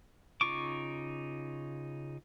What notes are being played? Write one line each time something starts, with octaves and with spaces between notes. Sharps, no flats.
C#3 D#4 F4 C#6 D6